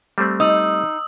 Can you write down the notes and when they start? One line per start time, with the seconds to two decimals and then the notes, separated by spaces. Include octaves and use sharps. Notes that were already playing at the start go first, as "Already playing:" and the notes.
0.18 G3 A3 C4
0.40 D#4 D#6 E6 F#7